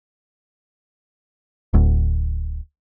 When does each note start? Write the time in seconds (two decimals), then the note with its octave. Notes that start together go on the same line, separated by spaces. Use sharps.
1.74 D1 D2